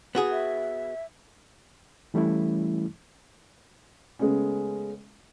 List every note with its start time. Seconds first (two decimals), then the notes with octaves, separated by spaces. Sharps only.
0.15 B3 F#4 G#4
0.32 E5
2.14 E3 G3 A3 C#4 E4
4.19 C#3 G#3 A3 B3 C#4